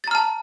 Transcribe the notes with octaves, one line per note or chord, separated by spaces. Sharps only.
A5 A#5 F6 A6